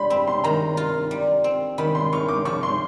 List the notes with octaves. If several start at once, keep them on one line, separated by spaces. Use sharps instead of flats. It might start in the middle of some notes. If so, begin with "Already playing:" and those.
Already playing: G3 B5 C6
C4 B5
C6
D#3 A#5
F4
G3
C4
D#3 B5
C6
F4 C#6
D6
F3 C#6
C6